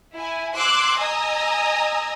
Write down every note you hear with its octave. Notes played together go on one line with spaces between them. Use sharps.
E4 G#5
C6 D6 E6 F#6 G#6 C7
D#5 G#5 A#5 D#6 E6